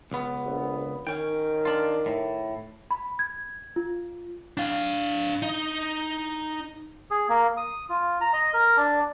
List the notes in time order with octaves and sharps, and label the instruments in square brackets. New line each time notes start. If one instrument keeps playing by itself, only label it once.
[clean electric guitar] C#2 B3
[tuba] A#1
[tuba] D#3 [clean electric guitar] C#4 G5
[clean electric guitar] D4 F4
A2
[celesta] B5
G#6
F4
[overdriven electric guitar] D4 F5
D#4
[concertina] G#4
A#3
D#6
F4
A#5
D#5
A#4
D4